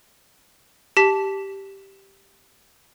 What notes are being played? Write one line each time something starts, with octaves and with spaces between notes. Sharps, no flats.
G4 A5 B6